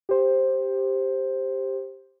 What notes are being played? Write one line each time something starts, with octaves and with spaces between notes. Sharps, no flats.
G4 C5